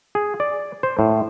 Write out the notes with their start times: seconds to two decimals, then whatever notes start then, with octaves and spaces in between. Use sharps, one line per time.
0.15 G#4
0.40 D5
0.83 C5
0.99 A2